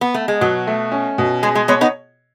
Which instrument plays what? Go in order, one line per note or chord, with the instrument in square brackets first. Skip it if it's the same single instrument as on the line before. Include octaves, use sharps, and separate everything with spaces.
[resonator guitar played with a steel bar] B3
A3
G#3
[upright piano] B2 [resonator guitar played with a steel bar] F#3
[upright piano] A3
C#4
B2
[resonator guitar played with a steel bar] G#3 [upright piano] G#4
[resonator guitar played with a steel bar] G#3
[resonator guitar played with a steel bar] G#3 B3 [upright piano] C#5
[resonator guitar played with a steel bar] B3 D#4